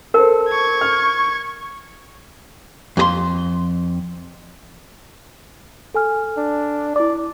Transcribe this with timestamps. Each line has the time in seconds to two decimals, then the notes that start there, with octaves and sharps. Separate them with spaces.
0.14 A4 A#4 C5
0.49 C#6 G#6
0.81 F6
2.97 F2 G#4 C6
5.94 A4 G#5 F6
6.37 D4
6.96 E4 D5 D6